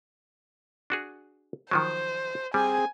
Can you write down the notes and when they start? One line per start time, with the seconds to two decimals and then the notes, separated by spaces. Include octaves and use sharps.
0.90 D4 F#4 G#4
1.71 D#3 F3 F#3 C5
2.54 G3 C4 G#4 G#5